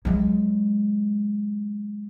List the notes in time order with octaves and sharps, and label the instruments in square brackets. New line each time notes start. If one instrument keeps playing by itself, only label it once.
[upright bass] F#3 G#3